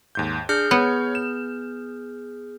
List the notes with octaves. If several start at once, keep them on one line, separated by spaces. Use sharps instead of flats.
D#2 G#2 G6
D4 G#4 F6 G6
B3 C#5
E7